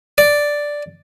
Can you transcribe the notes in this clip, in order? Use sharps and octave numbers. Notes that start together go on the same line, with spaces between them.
D5